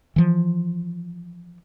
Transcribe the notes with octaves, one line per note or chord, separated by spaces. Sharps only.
E3 F3